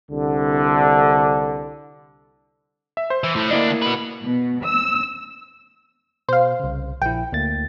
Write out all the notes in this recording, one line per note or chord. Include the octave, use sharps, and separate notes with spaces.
C2 D3
E5
C5
E3
A2
D2 A#3 D4 E4 D#5
F#4 B4
B2
E6
B2 C5 F5
C2 C#3
A#1 E4 G5
D2 A#3 A6